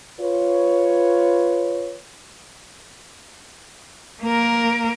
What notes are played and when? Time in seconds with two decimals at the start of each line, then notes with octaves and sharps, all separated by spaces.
0.19 F4 B4 C#5
4.22 A#3 A#4